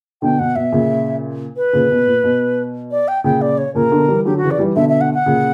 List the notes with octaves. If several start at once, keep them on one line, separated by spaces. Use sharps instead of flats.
B2 D3 G5
B2 F#5
B2 E5
A#2 C#3
B4
A#2 C#3
B2
A#2
B2
D5
G5
A#2 C#3 G5
D5
C#5
A#2 C#3 A#4
B2 D3
E3 G3
D3 F#3 G4
C#3 E3 F#4
D5
E3 G3
B2 D3 E5
E5
F#5
F#5
A#2 C#3